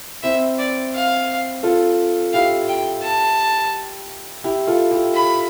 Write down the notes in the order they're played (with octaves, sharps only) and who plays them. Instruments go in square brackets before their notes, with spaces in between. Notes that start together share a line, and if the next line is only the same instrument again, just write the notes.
[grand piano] C4 E4 [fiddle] E5
[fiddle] D5
F5
[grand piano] F4 A4
[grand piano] E4 G4 [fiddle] F5
[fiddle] G5
A5
[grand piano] E4 G4
F4 A4
E4 G4
[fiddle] B5